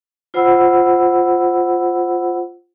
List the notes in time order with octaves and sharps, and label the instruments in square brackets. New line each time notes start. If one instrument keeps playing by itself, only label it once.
[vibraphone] F4 C5 F#5 B5 E6